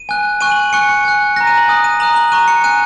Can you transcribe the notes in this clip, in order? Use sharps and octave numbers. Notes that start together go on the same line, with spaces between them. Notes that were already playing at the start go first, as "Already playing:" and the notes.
Already playing: D#7
G#5 F#6
G#5 C#6 F#6 D#7
F#7
G#5 C#6 F#6 C#7
C#7
G#5 F#6
A#5 F#6 A#6
D#7
F#7
G#5 D#6 F#6
D#7
A#5 D#6 F#6 F#7
F#7
A#5 C#6 F#6 D#7
C#7
G#5 F#6 D#7